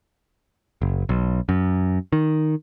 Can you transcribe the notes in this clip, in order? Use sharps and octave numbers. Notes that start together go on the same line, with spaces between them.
F#1
B1
F#2
D#3